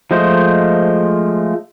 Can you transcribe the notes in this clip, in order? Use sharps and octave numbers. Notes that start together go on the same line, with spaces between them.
F3 G#3 A3 C5 D#5